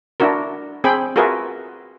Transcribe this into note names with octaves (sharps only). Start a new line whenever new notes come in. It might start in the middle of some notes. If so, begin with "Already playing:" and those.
D4 E4 F#4 A#4
C4 G#4 G5 B5
F4 F#4 G#4 A#4 B4 E5